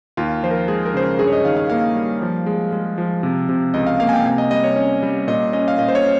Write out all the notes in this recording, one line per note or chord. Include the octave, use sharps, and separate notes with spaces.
D#2 F4
F3 C5
A#4
G#3 G#4
A#4
C#3 C5
A#4
G2 G#4
C#5
D#5
D#3 F5
F5
A#3 F5
G3
F3
G#3
G#3
F3
C3
C3
C#2 D#5
F5
A#3 F5
G#5
G5
C3 G#5
D#5
G3 D#5
C#5
C#4
G3
A#2 D#5
C#4 D#5
F5
A#2 D#5
C5
C#5
C#4